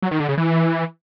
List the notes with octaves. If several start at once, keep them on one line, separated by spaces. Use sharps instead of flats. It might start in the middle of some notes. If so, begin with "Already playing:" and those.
F#3
D#3
D3
C#3
E3